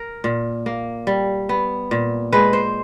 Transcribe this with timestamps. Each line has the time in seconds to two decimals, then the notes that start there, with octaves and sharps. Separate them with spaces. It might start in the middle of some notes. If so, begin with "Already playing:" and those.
Already playing: A#4
0.24 A#2
0.66 A#3
1.07 G3
1.49 B3
1.91 A#2
2.32 G#3 B4
2.53 C5